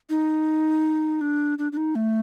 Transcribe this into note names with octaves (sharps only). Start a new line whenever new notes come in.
D#4
D4
D4
D4
D#4
A3